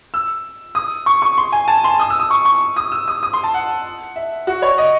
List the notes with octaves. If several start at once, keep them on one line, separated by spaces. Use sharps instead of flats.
E6
D#6
C#6
C#6
C6
G#5
A5
C6
D#6
E6
D#6
C#6
C#6
D#6
E6
D#6
D#6
C6
A5
F#5
E5
F#4
C#5
D#5